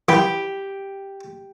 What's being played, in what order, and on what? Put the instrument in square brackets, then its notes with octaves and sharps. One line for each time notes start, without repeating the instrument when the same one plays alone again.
[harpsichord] E3 B4 [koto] G4